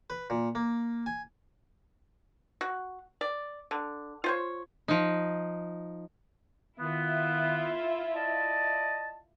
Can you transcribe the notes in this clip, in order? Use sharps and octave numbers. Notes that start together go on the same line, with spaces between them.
B4
A#2
A#3
G#5
F#4
D5
D3
F4 C5 C#5
F3 D#4
D#3 B3 E4 F4 E5
D5 D#5 A5